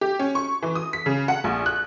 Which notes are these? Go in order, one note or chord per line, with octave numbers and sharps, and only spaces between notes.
G4
C#4
C#6
E3
D#6
B6
C#3
F#5
A#1
F#6